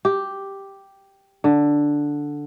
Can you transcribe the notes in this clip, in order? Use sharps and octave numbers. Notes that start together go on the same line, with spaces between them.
G4
D3